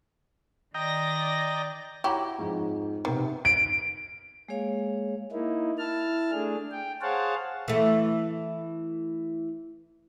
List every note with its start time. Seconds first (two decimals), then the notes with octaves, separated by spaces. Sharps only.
0.74 D#3 D5 D#5 G5 A#5 A#6
2.04 E4 F#4 G4 C#5 A#5
2.39 F2 G#2
3.05 C3 D#3 B3
3.45 D7
4.49 G#3 A#3 G#4 C#5 F5
5.32 A#3 D#4 E4
5.79 E4 A5 F6
6.32 A3 D4 G#4
6.71 G5
7.02 G#4 C5 C#5 F5 F#5 A5
7.68 E3 A3